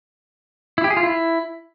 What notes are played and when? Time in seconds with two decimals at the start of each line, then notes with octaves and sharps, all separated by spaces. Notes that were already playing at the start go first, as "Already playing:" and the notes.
0.78 E4
0.84 G4
0.90 G#4
0.97 F4
1.03 E4